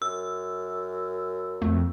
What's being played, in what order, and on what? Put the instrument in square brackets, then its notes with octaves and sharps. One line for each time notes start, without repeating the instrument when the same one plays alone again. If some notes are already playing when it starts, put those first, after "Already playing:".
[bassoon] F#2 [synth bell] E6
[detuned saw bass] F2 [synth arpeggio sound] A3